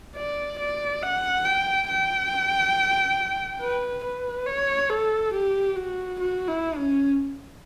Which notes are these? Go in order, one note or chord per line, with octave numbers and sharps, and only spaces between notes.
D5
D5
F#5
G5
G5
B4
B4
C#5
A4
G4
F#4
F#4
E4
C#4